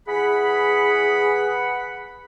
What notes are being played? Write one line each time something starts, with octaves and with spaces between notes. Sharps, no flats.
E3 G#4 F#5 B5